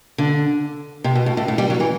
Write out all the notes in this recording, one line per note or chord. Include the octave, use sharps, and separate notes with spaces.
D3
C3
B2
A2
A2
A2
G3
F#3
E3